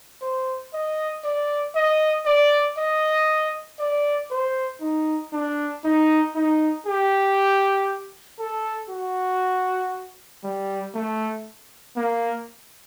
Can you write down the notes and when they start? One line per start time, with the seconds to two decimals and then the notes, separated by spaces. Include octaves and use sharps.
0.22 C5
0.73 D#5
1.24 D5
1.75 D#5
2.26 D5
2.77 D#5
3.79 D5
4.31 C5
4.81 D#4
5.33 D4
5.84 D#4
6.35 D#4
6.86 G4
8.39 A4
8.89 F#4
10.44 G3
10.94 A3
11.96 A#3